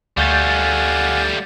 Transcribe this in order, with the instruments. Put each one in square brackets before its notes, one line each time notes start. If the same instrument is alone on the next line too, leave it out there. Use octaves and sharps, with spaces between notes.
[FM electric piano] D2 G6 A6 [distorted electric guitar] G3 A3 [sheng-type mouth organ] F5 F#5 G#5